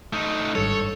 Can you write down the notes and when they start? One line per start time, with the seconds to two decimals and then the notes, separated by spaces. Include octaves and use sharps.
0.13 A3 D#4
0.55 G#1 G2 A4 C#5